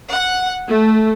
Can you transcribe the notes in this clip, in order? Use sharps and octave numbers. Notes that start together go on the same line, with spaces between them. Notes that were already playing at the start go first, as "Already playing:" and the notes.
F#5
A3